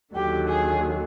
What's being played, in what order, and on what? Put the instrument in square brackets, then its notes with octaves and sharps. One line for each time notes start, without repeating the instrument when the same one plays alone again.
[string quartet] D#2 D3 F#3 G4
G#4